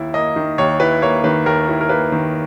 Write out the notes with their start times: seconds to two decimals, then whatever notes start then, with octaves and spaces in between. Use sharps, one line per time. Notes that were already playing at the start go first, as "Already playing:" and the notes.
Already playing: D#2 E4 E5
0.14 A#3 D#5
0.36 D#3
0.58 D#2 C#5
0.80 E4 B4
1.02 A#3 C#5
1.24 D#3 B4
1.46 D#2 A#4
1.68 E4
1.81 A#4
1.89 A#3 B4
2.12 D#3